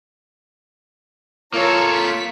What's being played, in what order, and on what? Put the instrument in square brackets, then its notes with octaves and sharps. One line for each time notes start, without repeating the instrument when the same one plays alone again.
[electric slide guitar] A#3 A4 [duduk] F4 [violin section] A#4 C#5 A#5
[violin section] B6